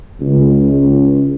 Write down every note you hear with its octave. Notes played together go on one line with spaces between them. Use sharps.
C#2